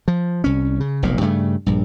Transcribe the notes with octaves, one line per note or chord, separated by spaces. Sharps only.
F3
C2 C#4
C#3
F1 B1 A#2
G2 C#3 A3
A#1 G2